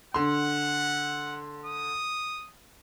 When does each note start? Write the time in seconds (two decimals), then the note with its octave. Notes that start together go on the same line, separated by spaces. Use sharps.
0.14 D3 F#5 C6
1.66 D#6